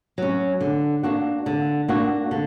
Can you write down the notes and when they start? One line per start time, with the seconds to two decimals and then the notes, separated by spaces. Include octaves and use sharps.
0.18 F#3 C#4
0.61 D3
1.03 A#3 D4 F#4
1.46 D3
1.88 A#3 D4 F#4
2.31 D3